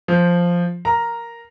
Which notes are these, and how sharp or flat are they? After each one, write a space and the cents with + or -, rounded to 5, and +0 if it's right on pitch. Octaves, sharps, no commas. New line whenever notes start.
F3 +0 C5 +0
A#4 +0 A#5 +0